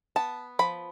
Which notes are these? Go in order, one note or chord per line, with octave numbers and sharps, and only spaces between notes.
B3 A5
F3 B5